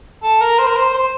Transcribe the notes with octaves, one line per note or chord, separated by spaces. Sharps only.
A4
A#4
C5
A#4
C5
C5